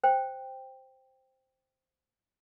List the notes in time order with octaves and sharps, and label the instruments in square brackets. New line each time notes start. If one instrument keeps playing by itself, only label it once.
[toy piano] C5 G5